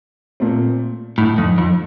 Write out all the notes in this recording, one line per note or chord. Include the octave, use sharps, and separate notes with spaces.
A#2 A3 C4
A2 D3 A3 D#4
F2
F2